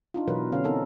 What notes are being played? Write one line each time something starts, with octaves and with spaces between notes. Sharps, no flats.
D4 D#4 F4
B2 E3 F#3 A#4 B4
D3 C#4 F5
B3 C4 D#4 A4 A#4